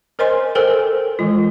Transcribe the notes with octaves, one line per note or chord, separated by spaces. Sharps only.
A#4 C5 C#5 D#5 G#5 C6
A4 A#4 C5 C#5 G5 G#5
E3 G#3 F4